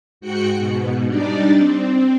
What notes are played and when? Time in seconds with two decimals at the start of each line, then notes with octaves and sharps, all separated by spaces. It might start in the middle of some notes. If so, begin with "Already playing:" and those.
0.21 G#2 F#4 G5 F#6 C#7
0.57 G#2 B2
1.07 G3 D4 D#4 D5
1.56 C4